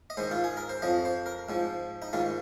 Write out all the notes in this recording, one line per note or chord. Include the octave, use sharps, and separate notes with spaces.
D#5
G#2 D#3 C5
F4
G#4
A#4
C5
F2 F3 D#5
C5
A#4
G#2 F3
D#4
G#2 D#3 F4